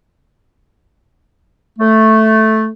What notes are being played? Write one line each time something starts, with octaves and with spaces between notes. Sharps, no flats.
A3